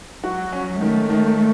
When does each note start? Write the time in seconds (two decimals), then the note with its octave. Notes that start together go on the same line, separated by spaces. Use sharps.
0.24 F#3 F#4
0.53 C#4
0.80 D#3 A3
1.09 D#3